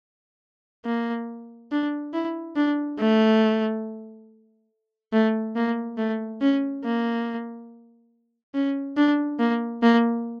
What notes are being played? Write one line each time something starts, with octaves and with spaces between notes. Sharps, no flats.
A#3
D4
E4
D4
A3
A3
A#3
A3
C#4
A#3
C#4
D4
A#3
A#3